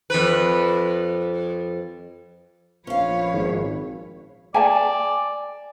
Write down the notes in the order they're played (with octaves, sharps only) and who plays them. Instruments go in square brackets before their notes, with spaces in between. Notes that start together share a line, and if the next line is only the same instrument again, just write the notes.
[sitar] F2 B4
[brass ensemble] A#1 F3 [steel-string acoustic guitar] C#4 F5 [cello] B4 C#5
[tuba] G#1
[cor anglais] D5 [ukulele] G#5 A5